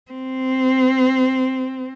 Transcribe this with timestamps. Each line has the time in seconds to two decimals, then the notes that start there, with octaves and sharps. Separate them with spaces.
0.11 C4